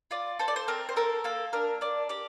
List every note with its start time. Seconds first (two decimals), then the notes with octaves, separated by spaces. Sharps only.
0.11 F4 D5
0.39 A4 C5
0.48 D5
0.56 C5
0.68 C4 A#4
0.89 C5
0.96 A4 A#4
1.24 A#3 A4
1.53 D4 A#4
1.81 D4 D5
2.09 G4 D5